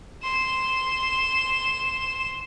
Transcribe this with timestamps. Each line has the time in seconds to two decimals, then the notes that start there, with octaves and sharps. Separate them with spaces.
0.24 C6 E7